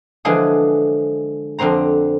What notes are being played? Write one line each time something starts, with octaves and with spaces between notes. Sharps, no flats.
D3 E3 F3 G#3 G#4
F2 D3 C4 C5 A#5